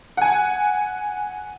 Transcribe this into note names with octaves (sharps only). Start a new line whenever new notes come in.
F#5 G#5